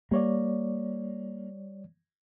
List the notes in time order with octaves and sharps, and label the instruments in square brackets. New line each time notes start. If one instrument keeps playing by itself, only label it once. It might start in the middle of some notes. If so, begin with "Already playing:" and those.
[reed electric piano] G3 C#5 D5 [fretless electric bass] A#3